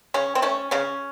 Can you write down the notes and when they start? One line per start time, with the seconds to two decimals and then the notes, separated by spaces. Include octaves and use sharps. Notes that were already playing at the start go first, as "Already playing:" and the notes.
0.14 C#3 C#4
0.35 C4
0.42 A3 C#4
0.71 C#3 C#4